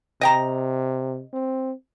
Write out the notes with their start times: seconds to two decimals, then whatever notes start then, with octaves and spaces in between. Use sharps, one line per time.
0.21 C3 D#5 G5 A#5
1.33 C4